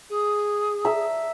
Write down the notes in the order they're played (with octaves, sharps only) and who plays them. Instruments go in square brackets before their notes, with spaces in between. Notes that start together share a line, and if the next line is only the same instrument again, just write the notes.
[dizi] G#4
[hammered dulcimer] E5 A#5